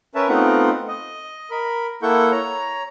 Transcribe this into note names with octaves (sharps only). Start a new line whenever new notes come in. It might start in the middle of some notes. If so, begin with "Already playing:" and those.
C#4 A#4 B4 C#5 E5 A5
A3 B3 C4 D#4 F4 F#5
D#5
A#4 B5
A#3 E4 A4 F#5 C#6 G6
C#5 A#5